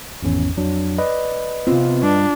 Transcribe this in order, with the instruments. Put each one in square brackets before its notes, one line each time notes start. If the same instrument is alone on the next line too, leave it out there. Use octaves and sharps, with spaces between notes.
[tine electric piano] G#1 E2 C#4
F2 F#3 D4
[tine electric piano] B4 D#5 [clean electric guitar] D5
[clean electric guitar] C3 B3 C4 [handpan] F4
[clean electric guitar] G2 [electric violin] D4